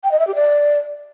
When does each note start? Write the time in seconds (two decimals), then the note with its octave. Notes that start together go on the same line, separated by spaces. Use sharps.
0.04 G5
0.12 D#5
0.19 E5
0.27 G4
0.35 D5